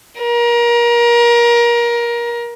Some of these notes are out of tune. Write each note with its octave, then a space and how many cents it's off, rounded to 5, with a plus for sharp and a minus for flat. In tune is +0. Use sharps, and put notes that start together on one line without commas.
A#4 +25